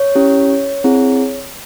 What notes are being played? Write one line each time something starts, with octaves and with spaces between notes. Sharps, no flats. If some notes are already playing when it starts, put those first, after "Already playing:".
Already playing: C#5
C#4 E4 G4
C4 E4 G#4